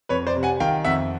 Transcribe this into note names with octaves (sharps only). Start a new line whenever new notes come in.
F2 B4 C#5
C5 D5
C3
F#5 G#5
D#3 F5 G5
F2 E5 F#5